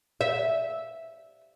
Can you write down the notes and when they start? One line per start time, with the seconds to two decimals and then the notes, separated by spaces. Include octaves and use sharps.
0.21 E5